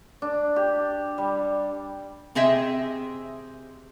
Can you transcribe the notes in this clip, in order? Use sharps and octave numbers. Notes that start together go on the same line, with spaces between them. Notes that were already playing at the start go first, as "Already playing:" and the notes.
D4
G4
G3
C3 C4 G#4 D#5 E5